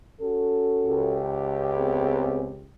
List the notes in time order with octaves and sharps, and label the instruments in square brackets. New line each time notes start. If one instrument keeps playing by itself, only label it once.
[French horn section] C#4 F#4 A4
[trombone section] C#2 G4
[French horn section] B3 C4 G#4